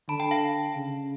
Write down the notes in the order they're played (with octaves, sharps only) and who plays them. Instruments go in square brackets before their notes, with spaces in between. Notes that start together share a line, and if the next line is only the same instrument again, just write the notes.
[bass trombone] D3 [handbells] A5 B5
[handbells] G5 A5
F5 G5
[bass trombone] C#3